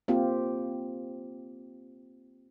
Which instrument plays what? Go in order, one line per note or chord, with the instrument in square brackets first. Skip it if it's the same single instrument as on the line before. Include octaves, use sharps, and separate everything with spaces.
[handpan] A#3 C4 F4 G4